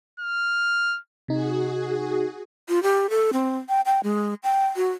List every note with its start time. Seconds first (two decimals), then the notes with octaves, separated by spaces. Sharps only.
0.20 F6
1.28 C3 D#4 F#4 G#4
2.69 F4
2.83 G4
3.10 A4
3.33 C4
3.69 G5
3.86 G5
4.03 G#3
4.43 G5
4.76 F#4